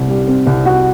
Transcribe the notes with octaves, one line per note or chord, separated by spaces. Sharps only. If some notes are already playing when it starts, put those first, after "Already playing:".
Already playing: C2 C3 C4
G3
C4
C2
F#4